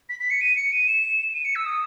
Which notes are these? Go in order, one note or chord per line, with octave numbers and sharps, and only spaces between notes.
B6
B6
C#7
D#7
C#7
D#7
E7
E7
D#7
C#7
E6
D#6